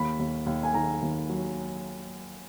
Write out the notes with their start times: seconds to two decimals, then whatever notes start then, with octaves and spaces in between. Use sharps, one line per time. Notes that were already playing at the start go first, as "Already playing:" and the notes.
Already playing: D#2 B5
0.19 D#2
0.46 D#2
0.63 G#5
0.74 D#3 A#5
1.02 D#2
1.30 F#3